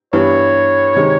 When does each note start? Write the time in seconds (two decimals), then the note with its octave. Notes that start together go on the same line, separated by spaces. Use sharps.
0.13 G2 E3 G3 B3 C#5
0.95 C3 D#3 G#3